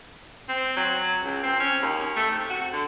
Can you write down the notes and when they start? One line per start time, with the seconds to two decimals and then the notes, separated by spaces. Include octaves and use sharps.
0.49 C4
0.76 F#3
1.23 C#2
1.43 C4
1.60 C#4
1.82 D#2
2.16 A3
2.31 C3
2.50 F#4
2.73 D3